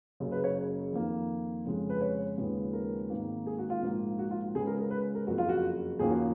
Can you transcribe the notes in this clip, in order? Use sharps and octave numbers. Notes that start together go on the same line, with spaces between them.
F#1 F#2 C#3
B4
C#5
F2 D#3 A#3
F2 C#3 G#3
B4
C#5
D#2 C#3 F3 G#3 B3
A#4
G#1 G#2 D#3 A#3
G#4
F#4
F4
A#1 G#2 F3 A#3
F#4
F4
C#2 C#3 G#3 B3 G#4
A#4
A#4
B4
A#4
F#1 F2 F3 F#4
F4
F#4
D#2 C#3 F3 A#3 G#4
F#4